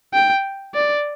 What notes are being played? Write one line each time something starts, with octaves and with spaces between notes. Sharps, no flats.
G5
D5